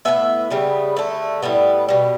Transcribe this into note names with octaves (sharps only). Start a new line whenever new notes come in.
A2 F#3 B3 E5
C#3 G3 B3
D3 A3
A2 G3 B3
B2 G3